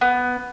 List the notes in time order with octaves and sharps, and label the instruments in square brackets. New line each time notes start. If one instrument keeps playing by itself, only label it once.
[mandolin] B3